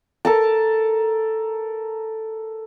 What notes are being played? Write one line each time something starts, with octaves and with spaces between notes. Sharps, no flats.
A4 A#4 A5